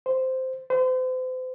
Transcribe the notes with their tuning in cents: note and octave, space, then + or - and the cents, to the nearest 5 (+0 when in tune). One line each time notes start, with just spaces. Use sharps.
C5 -10
C5 -40